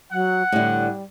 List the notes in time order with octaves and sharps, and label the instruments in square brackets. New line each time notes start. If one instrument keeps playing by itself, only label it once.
[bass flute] F#3 [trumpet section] F#5
[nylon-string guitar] A2 D3 [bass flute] G3